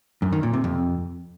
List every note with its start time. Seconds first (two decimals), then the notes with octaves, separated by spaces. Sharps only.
0.22 F#2
0.33 D#3
0.43 A#2
0.53 C3
0.64 F2